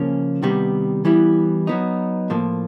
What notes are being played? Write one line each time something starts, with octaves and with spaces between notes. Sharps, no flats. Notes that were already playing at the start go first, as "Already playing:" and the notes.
Already playing: C#3 F3 A#3 C#4
C3 D#3 G3 B3
E3 G3 B3 E4
F#3 B3 D#4
A2 F3 A#3